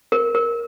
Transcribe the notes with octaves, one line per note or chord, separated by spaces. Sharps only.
A#4
A#4